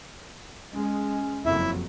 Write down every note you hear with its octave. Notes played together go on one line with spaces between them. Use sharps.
G#3 C#4
F#1 F2 F#3 E4 E5